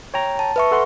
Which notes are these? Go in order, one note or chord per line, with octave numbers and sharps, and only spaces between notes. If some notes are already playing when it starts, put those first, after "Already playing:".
C#5 G5 A#5
A5
B4 E5 C#6
A4 F#5 C6